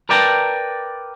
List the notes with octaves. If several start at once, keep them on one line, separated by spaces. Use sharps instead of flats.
A#4 B4 D5 G5 A5 A#5